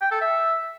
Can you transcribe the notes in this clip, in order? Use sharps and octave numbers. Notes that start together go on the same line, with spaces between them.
G5
A4
E5